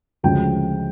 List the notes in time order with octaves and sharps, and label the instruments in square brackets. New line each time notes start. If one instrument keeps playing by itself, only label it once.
[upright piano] D2 C#3 F3 G#3 G5